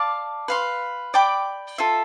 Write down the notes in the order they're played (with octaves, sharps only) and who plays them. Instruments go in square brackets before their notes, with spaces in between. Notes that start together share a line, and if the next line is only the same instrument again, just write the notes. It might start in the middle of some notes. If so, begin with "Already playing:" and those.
Already playing: [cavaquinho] D5 F5 A5
B4 F5 C6
D5 G5 B5 D6
F4 A4 E5